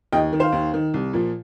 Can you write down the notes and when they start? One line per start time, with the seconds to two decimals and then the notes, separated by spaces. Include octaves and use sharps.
0.12 D#2 D#5 G5
0.33 D#3
0.40 C5 F5
0.52 D#2
0.74 D#3
0.94 C2
1.13 A#2 F3